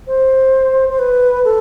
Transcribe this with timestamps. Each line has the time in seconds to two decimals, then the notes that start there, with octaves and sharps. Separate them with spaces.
0.07 C5
0.89 C5
0.99 B4
1.45 A4